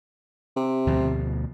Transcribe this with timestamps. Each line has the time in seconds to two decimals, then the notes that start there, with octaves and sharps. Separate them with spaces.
0.56 C3
0.87 D2 B2 F3